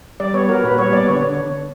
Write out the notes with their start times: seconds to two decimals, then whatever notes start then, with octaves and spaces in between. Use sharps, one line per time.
0.20 G3 D5
0.34 B3 C#5
0.49 F#4 A#4
0.63 A#2 B4
0.78 G3 C#5
0.93 B3 D5
1.08 D3 C#5